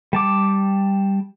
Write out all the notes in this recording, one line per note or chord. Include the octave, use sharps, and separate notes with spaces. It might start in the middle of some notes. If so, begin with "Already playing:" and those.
G3 A5 D6